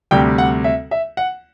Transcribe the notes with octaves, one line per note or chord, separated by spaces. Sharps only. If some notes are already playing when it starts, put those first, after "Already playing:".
D2 C3 G3 G5
F#5
E5
E5
F#5